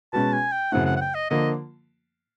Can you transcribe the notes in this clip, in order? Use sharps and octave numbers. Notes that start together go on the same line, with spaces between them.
B2 G#3 C#4 F#4 B4 A5
G#5
G5
F#2 C#3 E3 A3 C4 F#5
F#5
F#5
G5
D#5
D3 F3 A#3 D#5